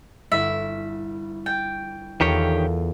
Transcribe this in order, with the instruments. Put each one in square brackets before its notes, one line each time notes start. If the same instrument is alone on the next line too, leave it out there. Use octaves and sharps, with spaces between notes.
[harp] G1 E4 [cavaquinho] E5
[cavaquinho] G5 [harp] A6
[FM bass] E2 [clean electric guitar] D#3 G4 C#5 [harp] F4 A4 A#4